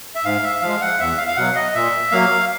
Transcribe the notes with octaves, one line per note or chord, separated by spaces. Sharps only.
E5
G#2 F5
E5
F3 G#3 F5
F#5
E2 E5
F5
F5
B2 F#3 F#5
D#5
A#2 E5
F#3 A#3 F5